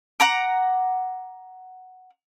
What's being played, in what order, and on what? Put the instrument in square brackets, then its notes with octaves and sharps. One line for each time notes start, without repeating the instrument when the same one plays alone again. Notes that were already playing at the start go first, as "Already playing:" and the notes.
[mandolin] F#5 A#5 D6